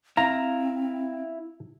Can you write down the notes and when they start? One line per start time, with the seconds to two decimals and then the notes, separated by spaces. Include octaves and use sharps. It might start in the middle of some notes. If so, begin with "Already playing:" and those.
0.17 C4 E4 F5 A#5